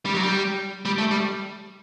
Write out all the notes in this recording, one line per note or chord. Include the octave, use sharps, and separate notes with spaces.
G3
F#3
G3
G3
A3
G3